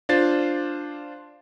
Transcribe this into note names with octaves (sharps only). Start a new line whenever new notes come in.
D4 F4 C5 A6 C7